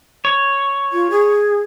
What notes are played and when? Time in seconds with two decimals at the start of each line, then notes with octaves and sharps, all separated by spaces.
0.25 C#5
0.92 F4
1.10 G#4